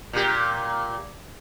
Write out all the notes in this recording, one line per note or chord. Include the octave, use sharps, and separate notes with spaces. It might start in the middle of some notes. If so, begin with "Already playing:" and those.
A#2 G4